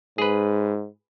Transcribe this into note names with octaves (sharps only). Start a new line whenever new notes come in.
G#2 G#4 B4